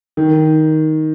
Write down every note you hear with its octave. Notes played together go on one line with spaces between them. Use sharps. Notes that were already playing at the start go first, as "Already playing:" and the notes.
D#3